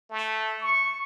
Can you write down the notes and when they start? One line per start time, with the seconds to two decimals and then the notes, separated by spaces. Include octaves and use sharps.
0.10 A3
0.61 C#6